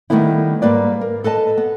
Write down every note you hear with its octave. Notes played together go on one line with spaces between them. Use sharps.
D#3 E3 G3 A3 B3 E4
G#2 G3 A#3 B4 D5
A#4
A4 B4 D#5 A5
B3